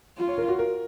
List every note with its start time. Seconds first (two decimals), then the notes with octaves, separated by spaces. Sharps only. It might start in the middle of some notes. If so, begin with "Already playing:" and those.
0.17 F4
0.28 C#5
0.38 A#4
0.48 F#4
0.59 A#4